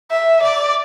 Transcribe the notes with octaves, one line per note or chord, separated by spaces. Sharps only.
E5
D5